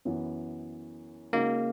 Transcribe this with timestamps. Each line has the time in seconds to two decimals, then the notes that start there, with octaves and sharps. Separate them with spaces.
0.05 F#2 E3 B3
1.33 C#3 G#3 A#3 D#4 F#4